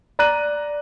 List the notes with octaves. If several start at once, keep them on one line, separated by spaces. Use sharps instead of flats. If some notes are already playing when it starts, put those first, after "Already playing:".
D5 A#5 F#6 D#7